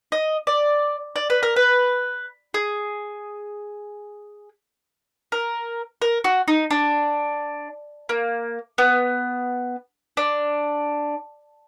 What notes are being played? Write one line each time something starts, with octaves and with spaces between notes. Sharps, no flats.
D#5
D5
D5
B4
A#4
B4
G#4
A#4
A#4
F#4
D#4
D4
A#3
B3
D4